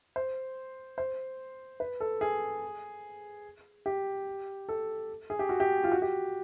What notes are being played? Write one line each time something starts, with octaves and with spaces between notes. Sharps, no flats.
C5
C5
B4
A4
G#4
G4
A4
G#4
G4
F#4
G4
F4
F#4
G4